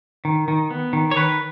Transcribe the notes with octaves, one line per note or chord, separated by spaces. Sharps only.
D#3
D#3
B3
D#3
C#5
D#3 B4